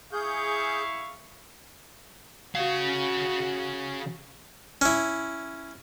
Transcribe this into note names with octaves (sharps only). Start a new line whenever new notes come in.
E4 G#4 F5 C#6 G6
C#3 F#4 F5
C#4 E4